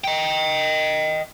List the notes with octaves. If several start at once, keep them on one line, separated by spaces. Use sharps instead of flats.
D#5 G5